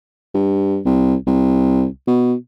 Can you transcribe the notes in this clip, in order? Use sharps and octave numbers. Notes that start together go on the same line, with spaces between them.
G2
C2
C2
B2